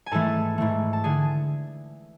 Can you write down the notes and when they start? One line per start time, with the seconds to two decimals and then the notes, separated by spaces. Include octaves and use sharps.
0.06 G#5
0.12 G#2 E3 A3 A4 A5
0.58 G#2 E3 A3
0.93 A5
1.04 D3 G#4 G#5